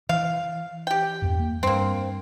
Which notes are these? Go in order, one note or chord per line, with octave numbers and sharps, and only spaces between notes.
E3 F5
G4 G5
E2 G2
A#3
G2 A#3 C4